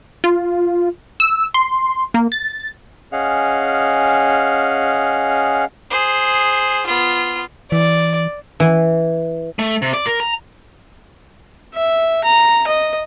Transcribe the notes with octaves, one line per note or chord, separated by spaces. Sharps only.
F4
E6
C6
A#3
A6
C#4 G#4 D#5 F5 F#5 F6
G#4 C5
B3 F4
E3 D5
E3
A3
C3
D5
A#4
A#5
E5
A#5
D#5